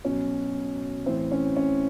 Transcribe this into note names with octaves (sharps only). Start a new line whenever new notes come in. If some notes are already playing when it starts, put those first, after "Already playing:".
B2 F#3 C#4
A2 E3 C4
C#4
C#4